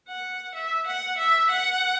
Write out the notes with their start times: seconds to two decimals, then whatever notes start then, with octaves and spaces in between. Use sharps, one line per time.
0.08 F#5
0.55 E5
0.87 F#5
1.18 E5
1.50 F#5